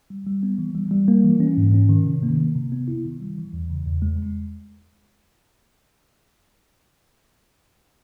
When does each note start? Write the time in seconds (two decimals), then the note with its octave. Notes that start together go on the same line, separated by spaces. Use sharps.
0.10 G3
0.27 G3
0.43 B3
0.58 E3
0.75 G3
0.91 G3
1.08 A#3
1.25 E3
1.40 C#4
1.57 G#2
1.74 C#4
1.89 D#3
2.06 C3
2.23 A#3
2.38 A#3
2.55 C3
2.72 B3
2.88 E4
3.05 D#3
3.20 G3
3.38 E3
3.53 E2
3.70 C#3
3.86 E2
4.02 G#3